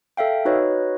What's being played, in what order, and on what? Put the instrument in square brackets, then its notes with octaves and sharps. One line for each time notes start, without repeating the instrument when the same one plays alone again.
[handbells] A4 E5 F5 G5
D#4 F#4 B4 C#5 D#5